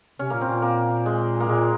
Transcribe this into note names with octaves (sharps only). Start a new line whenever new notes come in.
C3 C#4
A#2 A#3
C4
A#2
A#3
G#3
A#3
A#2 G#3